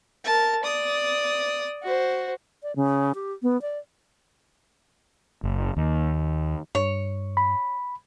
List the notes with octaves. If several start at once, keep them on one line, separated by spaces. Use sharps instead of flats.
A#4 A5
D5 D#6
F#4 C5
D5
C#3
G4
B3
D5
F#1
D#2
G2 C#5
B5